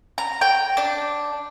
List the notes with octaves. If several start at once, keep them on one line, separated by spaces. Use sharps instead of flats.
A#5
G5
D4